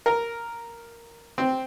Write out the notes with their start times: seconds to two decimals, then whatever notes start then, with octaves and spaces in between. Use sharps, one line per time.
0.06 A#4
1.38 C4